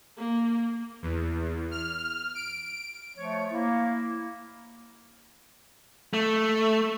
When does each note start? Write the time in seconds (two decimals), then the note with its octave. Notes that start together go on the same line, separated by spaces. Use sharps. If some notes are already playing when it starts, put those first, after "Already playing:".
0.17 A#3
1.02 E2
1.71 F6
2.35 D7
3.17 F3 A3 C#5
3.50 A#3 E4
6.14 A3